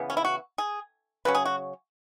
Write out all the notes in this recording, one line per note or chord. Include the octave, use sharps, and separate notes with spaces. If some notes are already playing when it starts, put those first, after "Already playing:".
Already playing: C#3 E3 B3
C#4
E4
F#4
G#4
C#3 F#3 C#4 B4
G#4
F#4